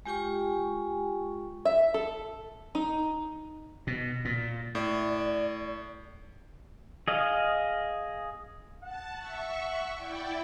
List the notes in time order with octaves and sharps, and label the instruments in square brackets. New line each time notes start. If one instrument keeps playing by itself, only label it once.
[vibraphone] G#3 F4 G4 G5 G#5 C#6
[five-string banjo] E5
A4
D#4
[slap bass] B2
A#2
[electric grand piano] A2 [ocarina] D5
[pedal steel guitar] G#4 D#5 F5
[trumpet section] F#5 [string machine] A5
[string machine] E5 C#6
E4 D5 G5